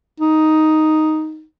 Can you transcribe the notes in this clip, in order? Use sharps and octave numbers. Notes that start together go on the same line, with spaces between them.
D#4